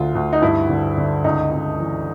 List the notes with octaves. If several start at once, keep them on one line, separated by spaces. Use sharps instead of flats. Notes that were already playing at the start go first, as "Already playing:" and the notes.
Already playing: D2 D3 F4
D2
D#4
G2 E4
D3
D3
C#2 D#4
C#2
E3